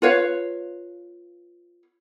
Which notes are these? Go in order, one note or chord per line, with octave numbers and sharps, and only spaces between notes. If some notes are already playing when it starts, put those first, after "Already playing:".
F4 B4 C#5 F5